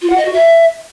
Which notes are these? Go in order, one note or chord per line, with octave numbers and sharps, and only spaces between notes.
F4
F#5
D#5
F#4
E5